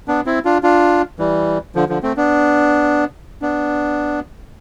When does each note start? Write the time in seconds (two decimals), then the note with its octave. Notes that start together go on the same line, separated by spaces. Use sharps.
0.08 B3 D4
0.26 C4 E4
0.45 D4 F4
0.63 D4 F4
1.19 E3 G3
1.75 D3 F3
1.89 D3 F3
2.03 A3 C4
2.17 B3 D4
3.42 B3 D4